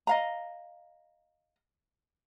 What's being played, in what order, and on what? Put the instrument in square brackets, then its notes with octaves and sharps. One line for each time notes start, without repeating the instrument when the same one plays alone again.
[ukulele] D#5 F5 A#5